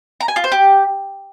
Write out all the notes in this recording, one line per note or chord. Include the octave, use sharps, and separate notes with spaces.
A#5
G#5
F4
C5
G4